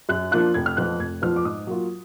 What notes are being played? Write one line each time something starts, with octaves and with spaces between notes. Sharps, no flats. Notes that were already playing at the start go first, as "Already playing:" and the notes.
F#2 F#6
F3 A#3 D4 F4 F#6
F1 G#6
F6
F2 F3 B3 F4 F#6
F1 G#6
F2 F3 B3 F4 F6
D6
G#2 D#6
F#3 A#3 F4